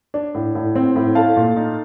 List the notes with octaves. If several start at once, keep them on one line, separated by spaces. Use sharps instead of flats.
D4
A2
A2
C4
A2
A3 F5 A5
A#2
D#4